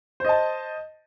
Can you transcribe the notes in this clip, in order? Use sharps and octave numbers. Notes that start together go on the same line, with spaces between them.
C5 D#5 A5